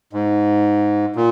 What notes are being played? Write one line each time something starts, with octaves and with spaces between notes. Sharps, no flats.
G#2
A#2